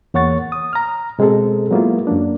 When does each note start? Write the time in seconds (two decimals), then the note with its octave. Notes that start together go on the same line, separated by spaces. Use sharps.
0.14 E2 A#3 C#5 F#5 C#6 A6
0.52 D#6
0.73 A#5 F6
1.19 B2 G#3 C4 G#4 A4
1.71 F#3 G#3 A#3 B3 E4 F4
2.07 F#2 F#3 A#3 D4